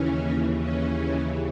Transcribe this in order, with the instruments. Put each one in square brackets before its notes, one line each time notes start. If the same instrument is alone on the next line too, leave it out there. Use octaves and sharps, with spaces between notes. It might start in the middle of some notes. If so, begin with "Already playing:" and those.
Already playing: [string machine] D#2 C#3 E3 C#4
C#4